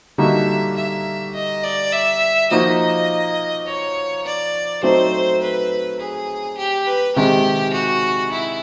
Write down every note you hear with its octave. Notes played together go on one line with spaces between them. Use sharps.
D3 G3 A#3 D#4 F#4 E5
E5
D#5
D5
E5
F3 A#3 D#4 F#4 D#5
C#5
D5
F#3 A3 C4 D#4 C5
B4
G#4
G4
B4
C3 D#3 G#3 G4
F#4
E4